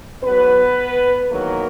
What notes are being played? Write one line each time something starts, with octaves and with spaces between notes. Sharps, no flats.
G#2 F#3 B3 B4
E2 D#3 F#3 A#3 A#4